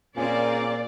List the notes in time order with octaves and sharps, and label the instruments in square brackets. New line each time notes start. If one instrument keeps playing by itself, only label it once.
[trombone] A#2 [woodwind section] C#3 C#4 [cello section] C4 A#4 [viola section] D5